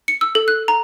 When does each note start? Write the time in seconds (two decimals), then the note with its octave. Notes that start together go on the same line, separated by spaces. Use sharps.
0.08 C#7
0.21 E6
0.35 A4
0.48 F#6
0.68 A#5